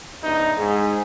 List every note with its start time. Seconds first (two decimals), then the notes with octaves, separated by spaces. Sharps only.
0.23 E2 G2 C3 D#4
0.57 G#2 G#4